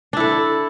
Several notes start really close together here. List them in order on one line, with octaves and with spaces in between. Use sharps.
D4 E4 A4